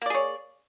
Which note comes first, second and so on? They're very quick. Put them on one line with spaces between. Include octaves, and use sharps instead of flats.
A#3 D5 G#4 C#5